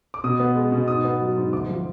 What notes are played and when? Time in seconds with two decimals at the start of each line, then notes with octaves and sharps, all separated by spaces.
0.14 D6
0.24 B2 D#6
0.40 B3
0.55 G#3
0.72 B2
0.88 G#2 D#6
1.04 B3
1.21 F#3
1.37 G#2
1.53 D2 D6
1.69 F3